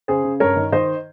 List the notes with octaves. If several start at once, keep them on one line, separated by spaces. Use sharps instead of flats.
C#3 G#4 C5
C#3
G2 A#4 C#5
D#3
D#3 C5 D#5